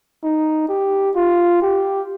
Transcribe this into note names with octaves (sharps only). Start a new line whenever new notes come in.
D#4
G4
F4
G4